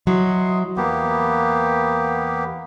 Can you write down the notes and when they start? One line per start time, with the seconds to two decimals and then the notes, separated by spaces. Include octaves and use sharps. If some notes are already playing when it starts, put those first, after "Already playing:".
0.07 F#3 E4 D#5 C6
0.77 E2 A#3 B3 G4